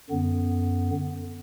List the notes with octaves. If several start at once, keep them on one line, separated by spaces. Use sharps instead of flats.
F#2 D3 B3